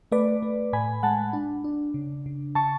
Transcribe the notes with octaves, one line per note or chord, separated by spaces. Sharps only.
A3 B4 D5
A3
A2 G#5 B5
G#3 F#5 A5
D4
D4
C#3
C#3
C#3 A5 C#6